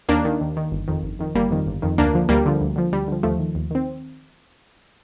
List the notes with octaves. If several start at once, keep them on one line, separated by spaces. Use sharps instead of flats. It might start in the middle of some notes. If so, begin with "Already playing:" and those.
D#2 A#3 D4
D#3
D#2
D#3
G1
F2 D#3
G1
F2 D#3
G1 G3 A#3
F2 D#3
G1
F2 D#3
D2 A#3 D4
D3 F3
D2 G3 A#3
D3 F3
D2
D3 F3
D2 G3
D3 F3
D#2 F3 A3
D#3
D#2
D#3 C4